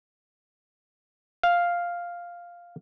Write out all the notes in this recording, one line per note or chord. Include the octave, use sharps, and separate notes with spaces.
F5